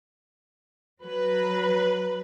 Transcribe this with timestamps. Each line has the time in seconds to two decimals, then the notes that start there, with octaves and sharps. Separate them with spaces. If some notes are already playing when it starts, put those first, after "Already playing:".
1.03 F#3 B4